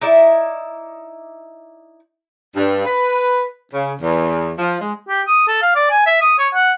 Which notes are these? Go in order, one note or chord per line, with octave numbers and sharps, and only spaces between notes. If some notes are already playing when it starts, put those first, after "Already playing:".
D#4 E4 D5 E5
G2
B4
C#3
E2
F3
G#3
G4
D#6
A4
F5
D5
G#5
E5
D#6
C#5
F#5